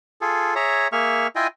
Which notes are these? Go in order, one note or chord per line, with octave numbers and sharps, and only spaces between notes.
F4 G#4 A4
G#4 C#5 E5 A#5
A#3 G#4 E5 C#6 F6
E4 F4 D#5 G5 G#5